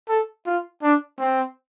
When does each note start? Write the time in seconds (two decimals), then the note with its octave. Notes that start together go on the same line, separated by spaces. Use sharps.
0.09 A4
0.46 F4
0.82 D4
1.19 C4